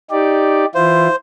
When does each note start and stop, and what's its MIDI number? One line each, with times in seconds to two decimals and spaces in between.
0.11 0.65 63
0.11 0.65 67
0.11 0.65 74
0.75 1.08 52
0.75 1.08 64
0.75 1.08 65
0.75 1.16 72